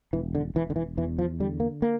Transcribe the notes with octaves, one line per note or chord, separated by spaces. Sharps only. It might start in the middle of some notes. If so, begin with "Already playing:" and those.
E1 E3
D3
E1 E3
D3
E3
E2 E3
F3
D3 G3
A#3
A#3